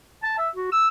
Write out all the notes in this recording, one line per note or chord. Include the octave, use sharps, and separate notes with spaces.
A5
E5
F#4
E6